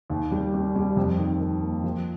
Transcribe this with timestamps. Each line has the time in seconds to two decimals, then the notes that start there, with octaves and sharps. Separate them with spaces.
0.10 D#2
0.31 G3
0.54 G3
0.75 G3
0.97 F2
1.19 D#3
1.41 D#3
1.62 A#3
1.84 F3